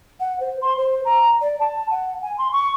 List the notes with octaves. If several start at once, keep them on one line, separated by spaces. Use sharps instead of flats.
F#5
C5
C6
C5
A#5
D5
A5
F#5
G#5
C6
C#6